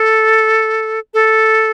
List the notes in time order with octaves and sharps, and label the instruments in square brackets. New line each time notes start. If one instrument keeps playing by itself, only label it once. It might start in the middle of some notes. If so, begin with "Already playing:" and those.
Already playing: [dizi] A4
A4